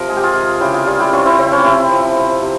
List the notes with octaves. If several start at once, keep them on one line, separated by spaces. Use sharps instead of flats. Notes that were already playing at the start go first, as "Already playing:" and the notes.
Already playing: C3 F3 A#4
G#3 G#4
G4
F4 G#4
C3
C#3 E4 G4
F4 G#4
G3 F4 G#4
E4 G4
C4 C#4 F4
C4 E4
C#3 C4
C#4
F4
C3 C4 E4
F3
C4
C3